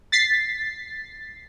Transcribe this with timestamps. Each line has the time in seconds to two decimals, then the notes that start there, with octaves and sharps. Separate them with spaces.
0.12 A6 B6 C7